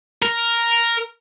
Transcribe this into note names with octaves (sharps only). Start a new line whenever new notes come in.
A#4